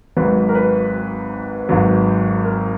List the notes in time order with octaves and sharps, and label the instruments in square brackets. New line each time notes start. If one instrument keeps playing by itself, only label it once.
[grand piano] G#1 G#2 F#3 B4
A#4
B4
G#1 G#2 F#3
A#4